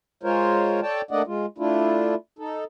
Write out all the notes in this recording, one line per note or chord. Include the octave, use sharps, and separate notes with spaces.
G#3 F4 A#4 C5 C#5
A4 C#5 D5 G5 A5
A3 A#3 D4 D5 D#5 F#5
G#3 F4
A3 D4 E4 F4
D#4 A4